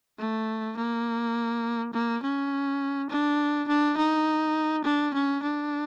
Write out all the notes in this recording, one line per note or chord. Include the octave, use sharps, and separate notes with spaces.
A3
A#3
A#3
C#4
D4
D4
D#4
D4
C#4
D4